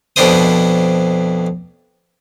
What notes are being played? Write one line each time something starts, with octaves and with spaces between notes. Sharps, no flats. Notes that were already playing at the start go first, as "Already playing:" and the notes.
F2 B2 D4 E4 C5 D#6